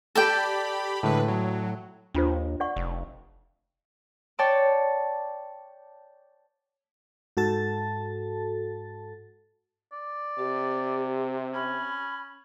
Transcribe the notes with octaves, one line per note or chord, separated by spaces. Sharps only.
G4 A4 D5 G5 B5
A2 D3 G#3 B4
F#3
D#2 D4 F4 C5
D5 F#5 C#6
F1
C#5 D5 G5 A5 D6
G#2 F#4 A4 A5 A6
D5
C3 G4
C#4 B5